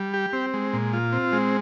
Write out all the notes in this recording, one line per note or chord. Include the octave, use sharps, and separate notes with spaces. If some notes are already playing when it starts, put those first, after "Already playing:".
Already playing: G3
G4
C4
G#3
A#2
F4
C4
G#3